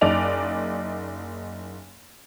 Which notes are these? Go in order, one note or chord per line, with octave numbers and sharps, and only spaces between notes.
F#1 D#4 D5 F7